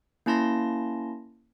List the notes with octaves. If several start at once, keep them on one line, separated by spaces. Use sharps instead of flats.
A#3 C#4 E4 A5 C6 A#6